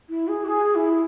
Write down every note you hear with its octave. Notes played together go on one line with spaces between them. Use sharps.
E4
G#4
F#4
G#4
E4